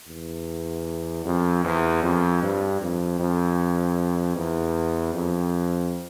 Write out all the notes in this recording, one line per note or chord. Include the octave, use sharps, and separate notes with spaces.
E2
F2
E2
F2
G2
F2
F2
E2
F2